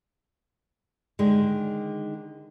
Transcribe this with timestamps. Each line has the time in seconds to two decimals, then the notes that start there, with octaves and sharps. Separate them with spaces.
1.19 D3 D#3 G#3